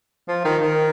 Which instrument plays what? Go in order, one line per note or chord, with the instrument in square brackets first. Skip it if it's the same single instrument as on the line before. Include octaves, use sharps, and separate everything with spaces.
[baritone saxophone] F3
D#3
D#3